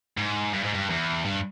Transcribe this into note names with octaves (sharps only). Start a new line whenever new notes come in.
G#2
G2
G#2
G2
E2
G2